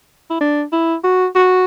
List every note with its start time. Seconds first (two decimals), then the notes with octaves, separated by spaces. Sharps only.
0.30 E4
0.41 D4
0.73 E4
1.04 F#4
1.35 F#4